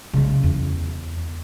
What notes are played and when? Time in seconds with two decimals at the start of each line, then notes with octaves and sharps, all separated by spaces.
0.13 C#3 G#3
0.44 E2